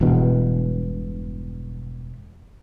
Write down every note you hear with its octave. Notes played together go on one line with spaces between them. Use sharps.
E1 E2 G2 B2